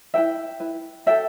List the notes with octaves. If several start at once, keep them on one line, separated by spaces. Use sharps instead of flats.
E4 B4 E5 G5
E4 B4
F#4 A4 E5 G5